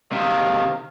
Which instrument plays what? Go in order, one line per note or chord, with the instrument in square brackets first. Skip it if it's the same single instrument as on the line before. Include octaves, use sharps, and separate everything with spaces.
[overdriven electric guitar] C3 D#3 [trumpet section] F5